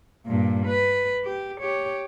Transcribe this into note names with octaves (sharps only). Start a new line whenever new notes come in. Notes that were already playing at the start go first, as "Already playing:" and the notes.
G2 A#2
B4
G4
G4 C#5